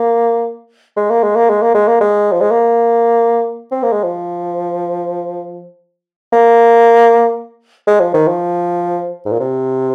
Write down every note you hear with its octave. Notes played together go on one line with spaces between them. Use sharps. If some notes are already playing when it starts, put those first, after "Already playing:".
Already playing: A#3
G#3
A#3
G#3
A#3
G#3
A#3
G#3
A#3
G#3
F3
G#3
A#3
C4
A#3
G#3
F3
A#3
G#3
F3
D#3
F3
G#2
A#2
C3